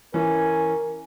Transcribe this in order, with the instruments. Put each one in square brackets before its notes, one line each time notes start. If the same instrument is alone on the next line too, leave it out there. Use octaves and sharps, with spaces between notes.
[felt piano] E3 [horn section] C#4 G#5 [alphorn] A#4